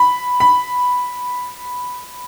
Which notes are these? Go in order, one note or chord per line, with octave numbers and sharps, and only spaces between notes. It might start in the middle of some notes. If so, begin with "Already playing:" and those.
Already playing: B5
B5